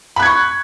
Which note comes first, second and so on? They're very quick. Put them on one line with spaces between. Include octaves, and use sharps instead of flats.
B5 F#6 G#6 C#6